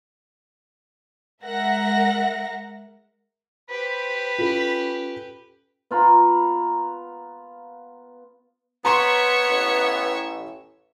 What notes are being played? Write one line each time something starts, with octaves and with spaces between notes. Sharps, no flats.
G#3 A#4 E5 F#5 A#6
G4 B4 C5 B5
C#4 F4 A4
B3 F4 A#5 B5
B3 C#5 E5 A#5 C6 C#6
A1